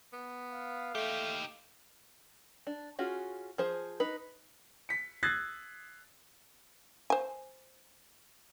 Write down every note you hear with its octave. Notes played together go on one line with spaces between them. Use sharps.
B3
F5
A3 D#4 G4
D4
C#4 F4 F#4 G#4
F3 G#4 C5
D#4 B4
B6 C#7
D#6 E6 F#6 G#6 A6 C7
C5 G#5